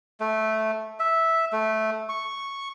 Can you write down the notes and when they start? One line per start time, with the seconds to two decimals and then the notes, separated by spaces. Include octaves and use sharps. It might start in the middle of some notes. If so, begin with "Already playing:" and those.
0.20 A3
1.00 E5
1.53 A3
2.09 C#6